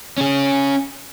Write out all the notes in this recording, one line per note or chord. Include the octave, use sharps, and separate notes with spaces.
C#4 G#4